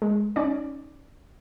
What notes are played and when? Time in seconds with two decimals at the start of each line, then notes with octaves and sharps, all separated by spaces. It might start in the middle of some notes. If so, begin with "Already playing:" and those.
0.02 G#3
0.36 C#4 D#4 D5